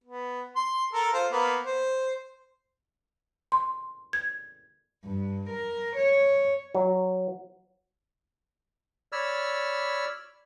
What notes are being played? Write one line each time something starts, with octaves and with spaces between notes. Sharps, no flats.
B3
C6
A4 A#4
F4 C5
A#3 B3
C5
C6
G#6
G2
A#4
C#5
F#3
C#5 D5 B5 E6 F6